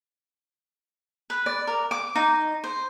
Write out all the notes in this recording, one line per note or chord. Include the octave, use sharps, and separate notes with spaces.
B4
D5
A#4
D6
D#4
C5